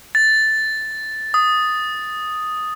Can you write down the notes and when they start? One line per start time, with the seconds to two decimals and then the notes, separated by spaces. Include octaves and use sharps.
0.15 A6
1.34 D#6